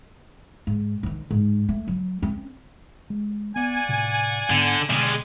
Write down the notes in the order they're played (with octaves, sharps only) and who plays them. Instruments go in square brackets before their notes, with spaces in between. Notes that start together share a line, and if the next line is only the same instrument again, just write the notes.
[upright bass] G#2
C3 D#3
G#2
A3
F#3
C4 C#4
[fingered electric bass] G#3
[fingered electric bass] B3 [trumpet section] D5 F#5 G#5
[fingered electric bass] A2 C3
[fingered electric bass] G#2 B3 [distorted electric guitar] D3
[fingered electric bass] B2 D3 [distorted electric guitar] G3 G#3